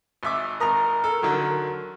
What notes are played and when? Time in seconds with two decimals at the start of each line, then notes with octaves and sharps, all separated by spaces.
0.23 G#1 E5 D6
0.60 G#1 A#4 A#5 D#6
1.04 A4
1.22 D3 D#3 F#3